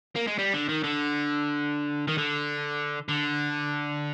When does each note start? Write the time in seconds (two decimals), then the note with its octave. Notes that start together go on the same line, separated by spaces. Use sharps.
0.15 A#3
0.27 G#3
0.38 G3
0.53 D3
0.69 D#3
0.83 D3
2.07 D#3
2.18 D3
3.08 D3